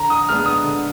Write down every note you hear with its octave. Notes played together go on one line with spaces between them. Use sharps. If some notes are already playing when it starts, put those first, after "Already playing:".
Already playing: D3 A#5
D#6
G#3 B3 D4 F6
D#6
D3